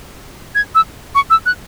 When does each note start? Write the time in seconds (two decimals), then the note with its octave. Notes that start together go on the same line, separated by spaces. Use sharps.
0.55 G#6
0.75 E6
1.15 C#6
1.30 E6
1.46 F#6